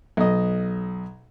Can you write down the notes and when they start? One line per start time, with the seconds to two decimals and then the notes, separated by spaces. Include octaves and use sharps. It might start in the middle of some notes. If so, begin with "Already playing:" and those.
0.17 B1 D#5